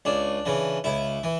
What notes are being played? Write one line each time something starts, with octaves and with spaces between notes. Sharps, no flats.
C#2 D4
C#3 E3
C#2 E4
E3